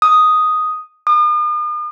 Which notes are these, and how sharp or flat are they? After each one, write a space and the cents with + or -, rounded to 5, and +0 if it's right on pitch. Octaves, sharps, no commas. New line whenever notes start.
D#6 +0
D#6 -45